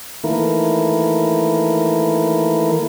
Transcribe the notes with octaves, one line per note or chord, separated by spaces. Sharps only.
D#3 E3 A3 A#3 E4 A#4